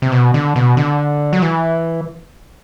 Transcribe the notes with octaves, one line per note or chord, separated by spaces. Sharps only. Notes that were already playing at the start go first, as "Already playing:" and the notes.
C3
B2
D3
B2
D3
F#3
E3